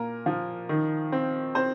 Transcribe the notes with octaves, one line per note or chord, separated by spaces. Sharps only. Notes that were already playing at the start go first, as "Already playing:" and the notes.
Already playing: A#2 A#4
F3
D#3
C4
C4 C5